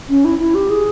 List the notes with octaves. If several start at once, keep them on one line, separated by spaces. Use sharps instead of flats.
C#4
E4
E4
G4
G#4